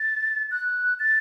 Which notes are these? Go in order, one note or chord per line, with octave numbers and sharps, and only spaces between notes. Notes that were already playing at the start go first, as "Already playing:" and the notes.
Already playing: A6
F#6
A6